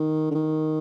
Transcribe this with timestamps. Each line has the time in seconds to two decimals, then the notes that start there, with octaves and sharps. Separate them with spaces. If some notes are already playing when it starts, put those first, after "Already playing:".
Already playing: D#3
0.31 D3
0.35 D#3